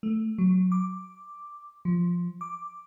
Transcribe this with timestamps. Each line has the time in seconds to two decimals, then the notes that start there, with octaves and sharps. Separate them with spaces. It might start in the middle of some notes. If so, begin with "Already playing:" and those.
0.03 A3
0.38 F#3
0.72 D6
1.85 F3
2.41 D6